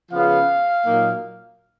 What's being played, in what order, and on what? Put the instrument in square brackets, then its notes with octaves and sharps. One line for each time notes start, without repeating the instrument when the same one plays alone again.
[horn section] C#3 F3 B3 F5
A#2 F#3 A#3 D#4